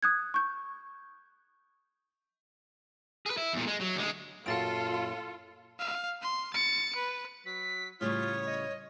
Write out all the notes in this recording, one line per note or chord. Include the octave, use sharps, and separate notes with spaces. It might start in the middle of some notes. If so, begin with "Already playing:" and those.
D#6 F#6 G#6
C#6 G6
G#4 B4
E4
E2 A#2
G#3
F#3
D2 G#3
F#2 A#2 F4 F#4 A4 F5 A6 D7
F5
C6
A6 C#7
B4
F#3 B6
A2 C#3 G3 F4 C#5 D#6
D#5